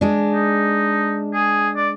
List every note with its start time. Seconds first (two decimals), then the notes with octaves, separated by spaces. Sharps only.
0.01 G#3 D4
0.33 D#4
1.34 G#4
1.76 D5